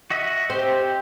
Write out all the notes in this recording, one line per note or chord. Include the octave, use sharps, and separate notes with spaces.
F#4 D#5 E5
C4 G4